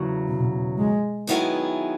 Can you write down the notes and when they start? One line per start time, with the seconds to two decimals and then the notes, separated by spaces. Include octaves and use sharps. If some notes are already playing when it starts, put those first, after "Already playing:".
Already playing: E2 C#3 F#3
0.28 B2
0.78 G#3
1.27 D#3 F#3 B3 E4 G#4